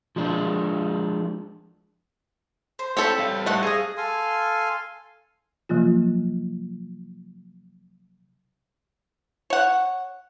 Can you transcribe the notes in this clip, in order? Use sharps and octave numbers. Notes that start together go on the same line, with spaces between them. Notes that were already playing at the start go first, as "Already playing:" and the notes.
F3 G#3 D4
C5
C4 A4 C#5 G5 B5
G3 F5
A3 D#4 C5 F#5
G#4 D#5 F5
A4 F5 G#5 C6
C3 F3 F#3 A#3 F4
C#5 F#5